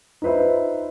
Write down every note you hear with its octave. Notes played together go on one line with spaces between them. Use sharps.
D#4 F4 B4 C5 E5